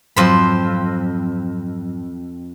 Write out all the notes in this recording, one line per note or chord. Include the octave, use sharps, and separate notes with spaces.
F2 G#2 F#3 C5 B5